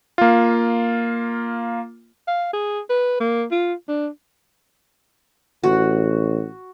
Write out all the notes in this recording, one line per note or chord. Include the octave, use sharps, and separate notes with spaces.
A#3 F4
F5
G#4
B4
A#3
F4
D4
A1 F#4